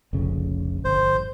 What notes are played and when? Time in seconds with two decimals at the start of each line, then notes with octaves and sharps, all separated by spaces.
0.13 F1 A#1 C#3
0.85 G1 C5